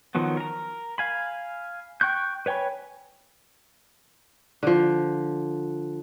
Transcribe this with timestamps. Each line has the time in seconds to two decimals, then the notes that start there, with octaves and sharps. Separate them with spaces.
0.15 D#3 F3 F#3 B3
0.37 A#4 A#5
0.98 F5 G#5 B5
2.01 G5 C#6 F#6 G6
2.46 B4 C#5 G5 G#5 B5
4.63 D3 F3